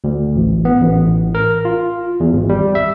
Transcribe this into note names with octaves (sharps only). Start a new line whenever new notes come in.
D2
A1
B3
A1
A#4
F4
E2
G#1
G3
E5